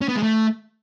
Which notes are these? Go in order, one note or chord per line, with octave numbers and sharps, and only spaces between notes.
C#4
B3
G#3
A3